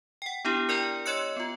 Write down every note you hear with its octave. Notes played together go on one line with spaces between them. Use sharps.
F#5 G5
B3 D4 E4 G4
A#4 D5 G5 A#5
C#5 D#5 C6 E6 F#6 C#7
B3 F4